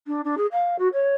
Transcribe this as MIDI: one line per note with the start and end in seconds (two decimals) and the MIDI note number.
0.07 0.21 62
0.24 0.35 62
0.37 0.46 68
0.52 0.76 77
0.79 0.88 66
0.93 1.16 73